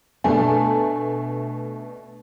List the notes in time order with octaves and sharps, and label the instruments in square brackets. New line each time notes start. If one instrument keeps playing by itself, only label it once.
[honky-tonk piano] B2 A3 [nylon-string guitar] D4 A4 [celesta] G#5